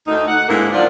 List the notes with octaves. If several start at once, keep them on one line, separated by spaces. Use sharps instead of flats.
D2 D#4
F#5
D2 G#2 D3 A#3 B3 E4
F3 F#3 A#3 D4 F4